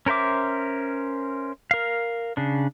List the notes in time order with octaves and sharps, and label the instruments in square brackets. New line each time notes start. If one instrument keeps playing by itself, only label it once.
[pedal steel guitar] C#4 A#4 C5 E5 D6
A#4 F5
C#3 D4